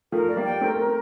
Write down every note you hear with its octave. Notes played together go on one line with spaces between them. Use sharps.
F3 A3 A#4
D5
G3 A#3
G5
A3 C4 A#4
A#4
A3